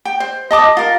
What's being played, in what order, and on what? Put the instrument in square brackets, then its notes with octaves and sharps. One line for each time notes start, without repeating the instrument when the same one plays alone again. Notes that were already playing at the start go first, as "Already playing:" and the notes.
[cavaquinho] G5
C5
D#5 A5 D6 D#6
F4 A#4